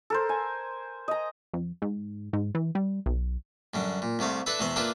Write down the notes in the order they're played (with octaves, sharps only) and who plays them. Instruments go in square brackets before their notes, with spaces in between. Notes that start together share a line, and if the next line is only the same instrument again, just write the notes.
[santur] A4 A#4 C5
G#5
D#5 A#5
[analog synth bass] F2
G#2
G#2
E3
G3
B1
[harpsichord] F#2 D3 G3
A#2
C2 C3 A3 F5
D4 E4 A4 B4 E5
E2 B2 B3 E4 C5 C6
A#3 D4 E4 F4 G4 B4